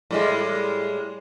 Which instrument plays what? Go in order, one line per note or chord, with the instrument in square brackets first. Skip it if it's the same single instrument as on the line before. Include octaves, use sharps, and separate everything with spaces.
[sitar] A2 G3 G#3